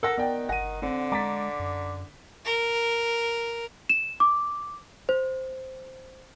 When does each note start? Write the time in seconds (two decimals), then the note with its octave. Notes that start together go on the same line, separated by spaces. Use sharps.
0.03 A4 A#4 F#5 E6 A#6
0.18 D#3 B3 D5 G5
0.49 G1 F#5 A#6 D#7
0.82 D3 C4
1.12 G#3 A#5 D6 A6 B6
1.60 F#2
2.45 A#4
3.89 E7
4.20 D6
5.09 C5